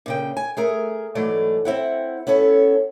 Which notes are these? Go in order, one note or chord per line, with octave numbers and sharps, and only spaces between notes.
A#2 C#3 G5
G#5
A3 G#4 A#4
G#2 E3 F#3 A3 D5
C4 E4 F#5
B3 C#4 A4 C#5